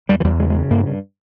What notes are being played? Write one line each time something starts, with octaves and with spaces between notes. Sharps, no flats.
E2 G3
E3
E2 G3
C#3 G#3
G#3
C#3
G2 A#3
G2